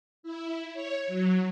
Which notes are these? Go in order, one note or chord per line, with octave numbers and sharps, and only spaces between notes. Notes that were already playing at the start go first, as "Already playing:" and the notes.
E4
C#5
F#3